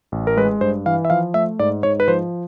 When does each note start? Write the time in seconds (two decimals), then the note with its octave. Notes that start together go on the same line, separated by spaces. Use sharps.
0.12 A1
0.27 A#4
0.37 G#3 B4
0.61 G2 C5
0.86 E3 F5
1.05 E5
1.10 F3 F5
1.34 A3 E5
1.59 G#2 D5
1.83 G#2 C#5
2.00 B4
2.08 F3 C5